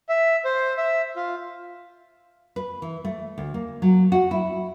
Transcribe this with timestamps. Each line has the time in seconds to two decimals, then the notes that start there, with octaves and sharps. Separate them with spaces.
0.09 E5
0.45 C5
0.77 E5
1.16 F4
2.56 B4
2.82 E3
3.05 A3
3.38 D2
3.54 A#3
3.82 F#3
4.12 F#4
4.31 E4